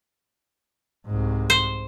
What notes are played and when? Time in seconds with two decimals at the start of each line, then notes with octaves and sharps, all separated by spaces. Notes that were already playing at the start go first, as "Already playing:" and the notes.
1.07 C2 G#2
1.50 C5